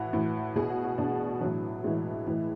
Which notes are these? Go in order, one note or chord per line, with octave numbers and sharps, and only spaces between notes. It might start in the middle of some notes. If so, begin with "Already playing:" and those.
Already playing: A2 E3 F#4
A2 E3
B2 G#4
F#4
F#4
B2 D4
A2 E3 F#3
A2 E3 G#3
A2 E3